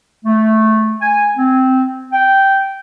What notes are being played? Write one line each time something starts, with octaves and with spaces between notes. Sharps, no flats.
A3
G#5
C4
G5